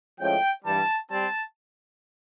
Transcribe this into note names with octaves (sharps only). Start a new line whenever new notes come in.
A2 F3 G#3 C#4 G5
G2 E3 G3 A5
G3 C4 A5